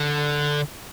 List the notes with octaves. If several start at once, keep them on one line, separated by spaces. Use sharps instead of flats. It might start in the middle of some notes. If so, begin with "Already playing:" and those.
Already playing: D3